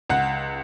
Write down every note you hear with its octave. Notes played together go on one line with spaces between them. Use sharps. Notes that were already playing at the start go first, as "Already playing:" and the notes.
C#2 F#5